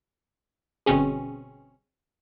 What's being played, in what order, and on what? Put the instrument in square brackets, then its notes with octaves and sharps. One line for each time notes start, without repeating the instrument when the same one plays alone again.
[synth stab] G1 B2 C4 C#4 G#4